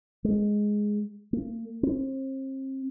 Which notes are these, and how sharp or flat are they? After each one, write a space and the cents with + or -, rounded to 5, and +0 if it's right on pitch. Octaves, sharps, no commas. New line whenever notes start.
G#3 +0
A#3 -40
C4 +35